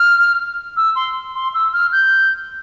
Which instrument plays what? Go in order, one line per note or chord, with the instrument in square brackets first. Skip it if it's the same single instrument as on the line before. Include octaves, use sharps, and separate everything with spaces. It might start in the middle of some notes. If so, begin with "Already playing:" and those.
Already playing: [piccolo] F6
E6
C6
C6
E6
F6
G6